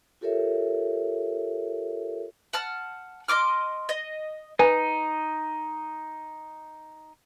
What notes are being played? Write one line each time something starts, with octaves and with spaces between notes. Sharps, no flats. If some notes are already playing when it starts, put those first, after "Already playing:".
F4 G4 A4 A#4 C#5 E5
F#5 A5 F6
D#5 C6 D6 F6
D#5
D#4 B4 G#5